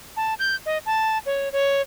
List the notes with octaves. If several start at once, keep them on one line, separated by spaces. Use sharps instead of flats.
A5
G6
D#5
A5
C#5
C#5